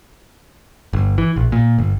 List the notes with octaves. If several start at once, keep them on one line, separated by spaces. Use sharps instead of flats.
G1
E3
A#1
A#2
G1